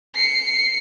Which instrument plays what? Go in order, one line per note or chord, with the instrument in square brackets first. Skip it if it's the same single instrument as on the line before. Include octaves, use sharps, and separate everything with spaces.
[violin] C7 C#7